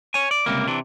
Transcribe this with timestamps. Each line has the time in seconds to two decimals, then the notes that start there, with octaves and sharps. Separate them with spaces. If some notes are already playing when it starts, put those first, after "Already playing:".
0.14 C#5 G#5
0.31 D5
0.46 C#2 C3 G3 A#3
0.68 C3 E3 D4